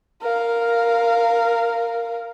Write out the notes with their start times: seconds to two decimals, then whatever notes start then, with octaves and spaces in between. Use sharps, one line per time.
0.22 A#4 F5